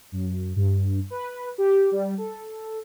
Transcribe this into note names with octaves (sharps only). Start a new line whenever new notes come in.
F#2
G2
B4
G4
G3
A4